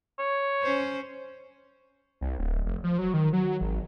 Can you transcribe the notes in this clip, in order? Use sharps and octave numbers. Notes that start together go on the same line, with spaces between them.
C#5
C#4 C5
C2
D1
F1
F3
F#3
D#3
F#3
G#1